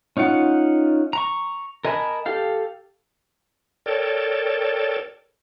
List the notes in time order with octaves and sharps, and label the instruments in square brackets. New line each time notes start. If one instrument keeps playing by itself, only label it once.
[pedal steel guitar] C#4 D#4 F4 F#5
A#5 C#6
A#4 D#5 G#5 A5 B5
G4 A4 F5
[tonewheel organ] A4 A#4 C#5 D5 G5 A5